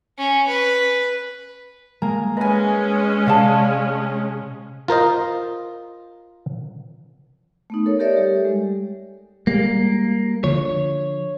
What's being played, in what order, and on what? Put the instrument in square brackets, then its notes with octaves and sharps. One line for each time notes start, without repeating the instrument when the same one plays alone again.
[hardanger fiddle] C#4
B4
[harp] G#3 A#3 G#5 [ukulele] A#5
[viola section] G#3 C#4 [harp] B4 A#6 [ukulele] D#5 G#5
[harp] C3 [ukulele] D5 F5 A5
[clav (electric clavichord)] F4 A#4 C5 D#5
[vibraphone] A3 B3 D#4
A4 A#4 C#5
G4 A4 A#4 C#5 D5 E5
G3 G4
G#3
[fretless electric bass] G3 G#3 [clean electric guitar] A#3
[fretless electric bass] D3 F3 [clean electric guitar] C#5